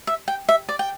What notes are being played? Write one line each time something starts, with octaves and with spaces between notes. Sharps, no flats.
E5
G5
E5
D5
G5